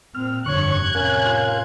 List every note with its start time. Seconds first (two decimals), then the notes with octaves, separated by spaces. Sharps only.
0.15 A#2 C4 F6
0.46 F1 G2 D3 C#5 C#6 F#6 G#6
0.95 A2 C3 C#4 A#4 F5
1.25 F4 C6